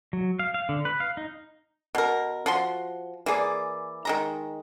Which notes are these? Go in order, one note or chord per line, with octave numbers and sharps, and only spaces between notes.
F#3
F5
F5
D3
B4
F5
D#4
B2 A#4
F3 F#4 C6
E3 A#3 G#4 D5
D#3 G#3 A#5